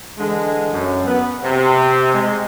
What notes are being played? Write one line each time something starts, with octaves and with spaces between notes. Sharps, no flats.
D3 E3 G#3
F#2
B3
C3
G#3